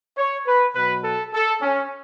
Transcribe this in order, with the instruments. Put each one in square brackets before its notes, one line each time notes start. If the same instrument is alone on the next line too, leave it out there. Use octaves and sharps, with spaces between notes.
[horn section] C#5
B4
B2 F#3 B4
A4
A4
C#4